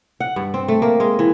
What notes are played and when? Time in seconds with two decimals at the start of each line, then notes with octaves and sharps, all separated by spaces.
0.20 F#5
0.36 G2
0.54 C4
0.68 A3
0.82 A#3
1.00 G#3
1.19 E3